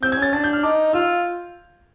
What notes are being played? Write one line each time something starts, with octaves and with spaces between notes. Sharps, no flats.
C4 G6
G#6
C#4 A6
D4 A6
G6
F6
D#4 D6
F4 E6